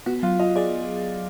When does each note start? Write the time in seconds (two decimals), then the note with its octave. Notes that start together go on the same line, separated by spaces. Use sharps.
0.06 B3 F#4
0.23 F#3 F4
0.40 F4 D#5
0.56 G#4 D5